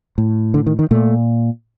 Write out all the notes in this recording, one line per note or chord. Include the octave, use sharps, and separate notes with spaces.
A2
D3
D#3
D#3
A#2 A3